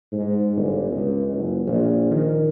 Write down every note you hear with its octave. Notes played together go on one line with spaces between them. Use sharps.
G#2
G1
C#2
F#1
A#1
D#3